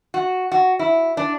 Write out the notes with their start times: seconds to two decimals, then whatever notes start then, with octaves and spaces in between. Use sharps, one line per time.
0.14 F#4
0.52 F#4
0.79 E4
1.17 D4